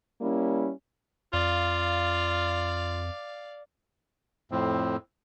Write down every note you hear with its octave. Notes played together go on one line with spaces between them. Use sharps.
G3 A#3 C#4 E4
F2 F4 D5 F5
F2 A2 C4